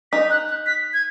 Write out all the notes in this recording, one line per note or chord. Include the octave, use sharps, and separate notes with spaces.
D#4 B6
F#6
F#6
B6
G#6